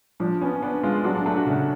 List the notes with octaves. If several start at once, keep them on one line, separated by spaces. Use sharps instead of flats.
F3 D4
B3 C#4
B3 D4
G#3 F4
F#3 D4
D4
A3 D4
F#4
C#3 D4